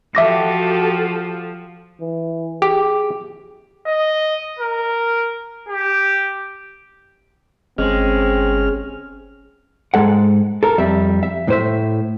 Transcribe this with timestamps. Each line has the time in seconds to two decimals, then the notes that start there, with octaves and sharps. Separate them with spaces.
0.15 F3 F#4 G4 A4 E5 D6 A#6
2.00 E3
2.62 G4 G#4
3.87 D#5
4.59 A#4
5.69 G4
7.78 G1 G#3 C4 C#4 F6
9.94 G#2 F#3 G#3 A4 F#5
10.63 A4 A#4
10.78 F2 G3 E5
11.23 E5
11.48 A2 C5 E5